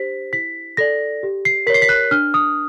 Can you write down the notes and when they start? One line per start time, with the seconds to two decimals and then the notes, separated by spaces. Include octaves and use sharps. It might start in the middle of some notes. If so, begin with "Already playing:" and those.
Already playing: D4 G4 C5 B6
0.33 E4 B6
0.77 A4 D5 A#6
1.23 G4
1.45 C7
1.67 A#4 B6
1.70 C#5 C7
1.82 B6
1.89 F#6
2.11 D4 F6
2.34 D#6